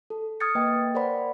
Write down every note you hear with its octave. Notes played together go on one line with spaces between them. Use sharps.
A4
D#6 F6 G#6 A6 C#7
A#3 B4 D#5 G5
A#4 C5 D5 F#5 B5